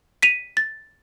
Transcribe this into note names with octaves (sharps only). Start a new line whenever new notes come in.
B6 D#7 F7
A6